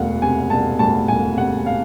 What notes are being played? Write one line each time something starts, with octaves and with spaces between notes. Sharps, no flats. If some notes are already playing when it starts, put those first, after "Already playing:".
Already playing: E1 D2 F5 F#5
C3 G#5
E1 A5
D2 A5
E1 G#5
C3 F#5
F5